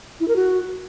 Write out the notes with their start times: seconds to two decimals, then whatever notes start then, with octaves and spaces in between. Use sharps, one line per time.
0.20 E4
0.28 A#4
0.36 F#4